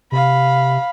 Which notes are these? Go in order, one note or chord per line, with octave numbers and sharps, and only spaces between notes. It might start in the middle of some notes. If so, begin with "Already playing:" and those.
C3 F5 B5